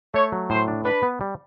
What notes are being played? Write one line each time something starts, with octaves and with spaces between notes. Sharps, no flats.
A3 C#5
F#3
A2 C5
D4
D4 B4
B3
G3